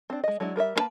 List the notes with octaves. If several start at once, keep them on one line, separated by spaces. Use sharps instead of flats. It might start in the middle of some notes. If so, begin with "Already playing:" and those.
C4 D4
G#3 D#5
F#3 G#3 D4 E4
G3 A#4 B4 E5
A#3 C4 D4 B4 A5